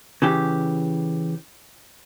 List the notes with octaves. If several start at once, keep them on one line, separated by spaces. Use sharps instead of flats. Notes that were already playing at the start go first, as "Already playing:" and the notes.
C#3 E3 G4